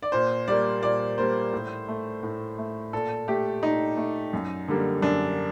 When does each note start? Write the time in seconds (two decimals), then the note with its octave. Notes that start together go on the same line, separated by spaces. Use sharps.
0.03 D5
0.12 A#2 C5
0.48 G3 A#3 D5
0.83 A#2 D5
1.18 G3 A#3 C5
1.53 A2
1.88 A3
2.23 A2
2.58 A3
2.93 A#2 A4
3.28 A3 G4
3.62 A#2 D#4
3.97 A3
4.33 F#2
4.68 D3 G3 A#3
5.02 F#2 D4